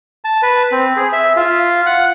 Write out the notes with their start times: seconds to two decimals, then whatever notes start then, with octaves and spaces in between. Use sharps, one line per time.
0.25 A5
0.43 B4
0.72 C4
0.96 G#4
1.13 E5
1.37 F4
1.86 F#5